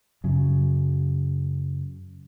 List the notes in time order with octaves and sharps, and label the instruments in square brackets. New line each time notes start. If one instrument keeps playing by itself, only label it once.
[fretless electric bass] F#2 C#3 F#3